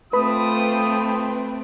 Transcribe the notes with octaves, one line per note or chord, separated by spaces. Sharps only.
A3 C4 F4 B4 B5 D#6